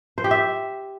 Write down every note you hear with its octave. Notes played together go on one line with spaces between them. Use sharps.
C5
G4
E5